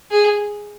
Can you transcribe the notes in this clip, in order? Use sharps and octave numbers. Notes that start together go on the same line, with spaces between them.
G#4